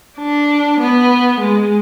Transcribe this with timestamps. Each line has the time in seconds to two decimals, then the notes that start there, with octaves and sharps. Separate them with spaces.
0.18 D4
0.80 B3
1.40 G#3